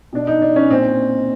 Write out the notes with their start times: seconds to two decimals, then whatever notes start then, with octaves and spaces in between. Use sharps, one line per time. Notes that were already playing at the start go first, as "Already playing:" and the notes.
0.13 B2 D4
0.27 D#4
0.42 D4
0.56 C#4
0.70 A#2 C4